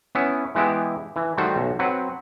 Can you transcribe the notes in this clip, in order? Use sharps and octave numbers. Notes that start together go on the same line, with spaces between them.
B3 C#4 E4
E3 G#3 B3 E4 G4
E3
D#3 G3 A3 F#4 C5
B1
F#3 C4 B4 F#5